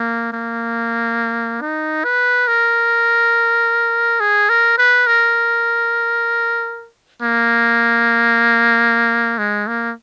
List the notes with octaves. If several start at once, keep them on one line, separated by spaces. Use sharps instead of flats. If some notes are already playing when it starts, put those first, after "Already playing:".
Already playing: A#3
A#3
D#4
B4
A#4
G#4
A#4
B4
A#4
A#3
G#3
A#3